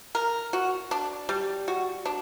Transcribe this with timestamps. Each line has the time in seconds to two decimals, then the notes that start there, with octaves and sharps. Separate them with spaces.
0.15 A#4
0.53 F#4
0.91 D4
1.29 G3
1.68 F#4
2.05 D4